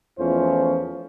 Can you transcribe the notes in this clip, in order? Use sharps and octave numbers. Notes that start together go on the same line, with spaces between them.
E2 F3 A3 C#4 F4 C5